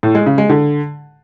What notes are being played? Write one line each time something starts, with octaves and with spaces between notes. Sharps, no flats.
A2
G#3
C#3
G#3
D3